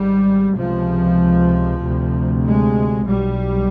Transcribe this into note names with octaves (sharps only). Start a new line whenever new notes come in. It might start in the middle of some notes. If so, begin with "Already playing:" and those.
Already playing: G#1 G#2 G3
C#2 C3 F3
D2 C3
G#3
B1 B2 G3